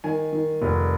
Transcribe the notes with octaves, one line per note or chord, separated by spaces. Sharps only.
D#3 G#5
D#3
F1